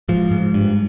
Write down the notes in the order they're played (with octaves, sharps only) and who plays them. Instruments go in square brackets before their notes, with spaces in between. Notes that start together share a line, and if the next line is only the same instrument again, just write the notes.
[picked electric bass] G#2 F3
G#2
G2